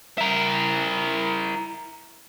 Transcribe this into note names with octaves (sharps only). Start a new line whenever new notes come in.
E4 A#4